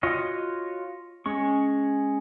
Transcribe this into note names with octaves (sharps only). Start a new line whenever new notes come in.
F4 F#4 C#5 D#5
G#3 C#4 C#6